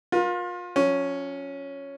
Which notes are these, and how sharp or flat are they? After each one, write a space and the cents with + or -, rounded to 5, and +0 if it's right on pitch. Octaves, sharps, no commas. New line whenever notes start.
F4 +30 A#4 +40
F3 +40 C#4 +0